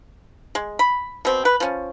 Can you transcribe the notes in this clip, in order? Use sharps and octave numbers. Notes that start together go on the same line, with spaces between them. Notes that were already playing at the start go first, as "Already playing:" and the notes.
G#3
B5
B2 C4
B4
F3 C#4